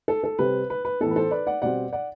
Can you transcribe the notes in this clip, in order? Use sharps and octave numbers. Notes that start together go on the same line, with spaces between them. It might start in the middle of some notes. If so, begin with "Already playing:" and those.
A4
A4
C3 G3 C4 B4
B4
B4
A2 E3 B3 A4
B4
A4 C5
B4 D5
D5 F#5
B2 G3 C4 D5 F#5
D5 F#5